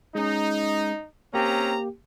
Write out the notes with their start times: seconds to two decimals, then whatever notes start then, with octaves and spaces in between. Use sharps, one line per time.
0.15 G#3 C#4 D#4
1.34 A#3 C4 C#4 G4 A#5